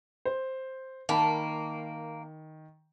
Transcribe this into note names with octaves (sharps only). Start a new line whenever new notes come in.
C5
D#3 A#3 A5 B5